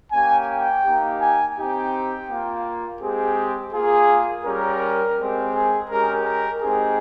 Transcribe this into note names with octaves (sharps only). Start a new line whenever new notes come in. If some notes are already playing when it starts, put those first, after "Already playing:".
A#3 C#4 G4 G#5
G5
A#3 D#4 G4
G#5
C4 D#4 G4 G5
A#3 F4
G#3 C4 G4 G#4
A#3 F4 G#4
G3 C#4 G4 A#4
G#3 C4 G4
G#4
G#3 C#4 G4 A#4
A#4
G#3 C4 D#4 G4 G#4